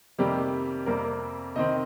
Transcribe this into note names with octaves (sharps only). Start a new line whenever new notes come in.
F2 C3 D#3 G3 A#3 G4
F2 C3 G3 A#3 A#4
C3 D#3 C4 D#5